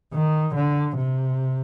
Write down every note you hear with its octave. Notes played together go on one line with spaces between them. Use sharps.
D#3
D3
C3